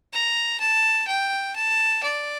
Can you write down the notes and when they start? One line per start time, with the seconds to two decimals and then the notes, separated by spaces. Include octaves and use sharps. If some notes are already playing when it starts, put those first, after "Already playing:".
0.13 A#5
0.60 A5
1.07 G5
1.55 A5
2.03 D5